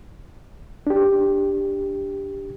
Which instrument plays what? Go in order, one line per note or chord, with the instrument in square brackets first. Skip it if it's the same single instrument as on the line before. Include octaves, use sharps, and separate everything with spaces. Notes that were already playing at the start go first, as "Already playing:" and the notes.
[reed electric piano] D4 G4